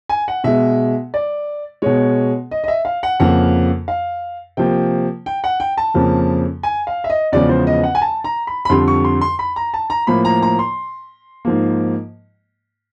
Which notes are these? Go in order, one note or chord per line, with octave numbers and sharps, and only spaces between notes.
G#5
F#5
B2 G#3 E5
D5
B2 G#3 C#5
D#5
D#5
E5
F5
F#5
F2 C#3 F3 A#3 F#5
F5
C3 F3 A#3 G5
G5
F#5
G5
A5
F2 C#3 F3 A#3
G#5
F5
E5
D#5
E2 C#3 F3 G#3 D5
C5
D#5
F#5
G#5
A5
A#5
B5
B5
F2 D3 G3 C6
C#6
C6
C6
B5
A#5
A5
A#5
A2 F3 A#3 B5
A#5
A#5
C6
G#2 F3 A#3